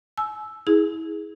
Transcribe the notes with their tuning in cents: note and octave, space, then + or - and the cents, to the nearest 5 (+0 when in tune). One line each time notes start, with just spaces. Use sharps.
G#5 +45 E6 +0
E4 -30 G#4 +0